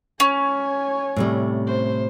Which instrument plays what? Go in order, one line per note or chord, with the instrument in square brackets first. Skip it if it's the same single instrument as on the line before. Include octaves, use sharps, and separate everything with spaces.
[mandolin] C#4 [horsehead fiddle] C#5 G#5
[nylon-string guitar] A2 C3 G3
[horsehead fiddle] C5